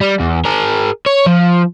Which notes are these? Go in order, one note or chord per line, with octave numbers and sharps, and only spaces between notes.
G3
E2
G#4 A#4
C#5
F3